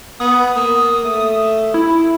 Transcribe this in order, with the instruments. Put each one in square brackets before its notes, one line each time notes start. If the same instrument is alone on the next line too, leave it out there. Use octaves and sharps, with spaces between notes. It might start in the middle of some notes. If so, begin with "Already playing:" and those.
[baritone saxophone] B3 [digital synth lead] D#6
[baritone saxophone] A#3
A3
[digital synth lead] E4